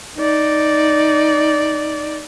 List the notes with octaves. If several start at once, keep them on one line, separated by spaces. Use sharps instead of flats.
D#4 D5